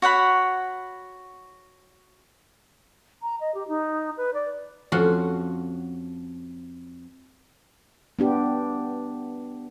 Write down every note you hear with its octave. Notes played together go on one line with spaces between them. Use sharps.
F#4 C#5 F#5 B5
A#5
D#5
G4
D#4
B4
D5
F2 F3 C#4 F#4
B3 D4 G4